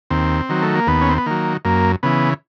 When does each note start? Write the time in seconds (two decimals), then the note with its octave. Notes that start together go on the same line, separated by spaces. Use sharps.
0.10 D#2 C4
0.49 D#3 F#3
0.62 A3
0.75 A#3
0.87 D#2 B3
1.01 C#4
1.10 C4
1.18 B3
1.26 D#3 F#3 A#3
1.65 F#2 A#3
2.03 C#3 E3 B3